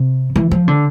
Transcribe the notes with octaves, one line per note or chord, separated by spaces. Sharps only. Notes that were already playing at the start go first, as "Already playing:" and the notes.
Already playing: C3
E3
F3
D3